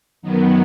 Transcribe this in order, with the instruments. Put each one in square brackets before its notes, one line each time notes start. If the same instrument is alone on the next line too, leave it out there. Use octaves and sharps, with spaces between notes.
[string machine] F#2 D#3 F#3 B3